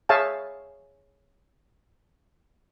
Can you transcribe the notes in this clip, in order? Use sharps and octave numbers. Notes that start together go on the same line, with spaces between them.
G#4 C#5 E5 F5 G#5 A5